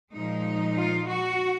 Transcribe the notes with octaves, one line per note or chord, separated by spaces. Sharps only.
A#2 F3 G#3 D#4
F4
F#4